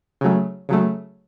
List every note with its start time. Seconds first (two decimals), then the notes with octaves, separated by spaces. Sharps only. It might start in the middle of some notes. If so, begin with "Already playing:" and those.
0.21 C#3 F#3 A3
0.69 C#3 F#3 A3